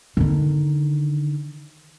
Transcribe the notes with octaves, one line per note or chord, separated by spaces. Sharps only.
D3 D#3